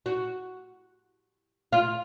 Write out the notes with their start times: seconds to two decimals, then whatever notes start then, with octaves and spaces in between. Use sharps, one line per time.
0.06 F#4
1.73 F4